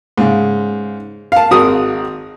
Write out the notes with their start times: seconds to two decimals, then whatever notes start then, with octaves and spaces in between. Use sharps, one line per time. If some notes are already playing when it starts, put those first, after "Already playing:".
0.18 G#2 C#3
1.32 F5 A5
1.51 G#1 F#4 A#4 D#6